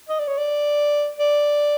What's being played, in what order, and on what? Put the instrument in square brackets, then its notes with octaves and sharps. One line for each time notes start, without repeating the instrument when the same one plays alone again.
[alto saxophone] D#5
D5
C#5
D5
D5